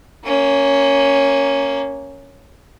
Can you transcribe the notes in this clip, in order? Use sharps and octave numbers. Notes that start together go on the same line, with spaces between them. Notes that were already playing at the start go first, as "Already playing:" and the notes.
A#3 C#4